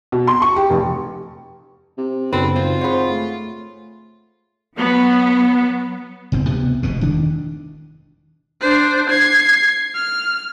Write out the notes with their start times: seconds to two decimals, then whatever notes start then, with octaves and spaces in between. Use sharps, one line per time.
0.12 B2
0.27 C6
0.42 C#6
0.56 G4
0.70 F1
1.98 C3
2.33 B1 F#2 C#3 C4 F#4 A4 B4
2.56 G#1 F4 C5
2.81 G#4 C5 C#5 F#5 B5
3.10 A3
4.77 F#3 B3
6.32 F#1 B1 C4
6.47 D2 C3 B3
6.83 F1 G#2 B2
7.01 E1 D#3 D4
8.61 D4 C5
9.10 G#6 C7
9.95 F6